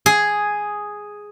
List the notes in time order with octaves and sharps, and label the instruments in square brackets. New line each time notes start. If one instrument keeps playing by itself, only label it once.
[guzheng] G#4